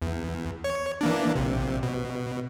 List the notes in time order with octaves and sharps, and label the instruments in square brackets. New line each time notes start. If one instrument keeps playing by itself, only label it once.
[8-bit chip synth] E2
C#5
E3 A#3 D4
A#1 C3
B2